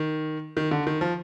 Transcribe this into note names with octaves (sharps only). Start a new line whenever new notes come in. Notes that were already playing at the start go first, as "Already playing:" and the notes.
Already playing: D#3
D#3
D3
D#3
F3